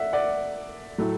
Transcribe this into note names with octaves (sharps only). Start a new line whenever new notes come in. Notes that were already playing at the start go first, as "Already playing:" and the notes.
Already playing: A3 D5 E5 F#5
D5 F#5
A2 F#3 A3 E4